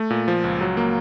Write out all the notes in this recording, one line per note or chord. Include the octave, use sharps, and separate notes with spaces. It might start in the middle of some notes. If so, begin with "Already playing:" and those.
Already playing: A3
A#2
F3
C#2
F#3
A#3